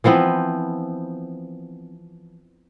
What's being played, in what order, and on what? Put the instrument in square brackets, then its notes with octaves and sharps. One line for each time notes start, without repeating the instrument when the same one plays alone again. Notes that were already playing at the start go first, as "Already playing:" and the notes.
[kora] E3 F3 B3 C4